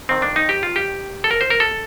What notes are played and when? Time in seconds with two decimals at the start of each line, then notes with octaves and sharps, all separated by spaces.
0.09 F2 D#3 C4
0.22 D4
0.36 D#4
0.49 G4
0.63 F4
0.76 G4
1.24 A4
1.31 A#4
1.41 C5
1.50 A#4
1.60 A4